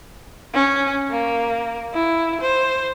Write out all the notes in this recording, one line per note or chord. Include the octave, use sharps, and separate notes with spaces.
C#4
A#3
E4
C5